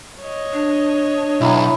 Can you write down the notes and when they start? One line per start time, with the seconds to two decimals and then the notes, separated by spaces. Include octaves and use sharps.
0.22 C#5 D#5
0.53 D4
1.41 B1 E4 A#5